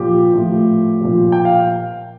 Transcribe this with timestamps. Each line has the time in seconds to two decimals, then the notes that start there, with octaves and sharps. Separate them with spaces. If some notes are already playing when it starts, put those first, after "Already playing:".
Already playing: A#2 F3 G4
0.34 A2 F3
1.01 A#2 F3
1.32 G5
1.45 F5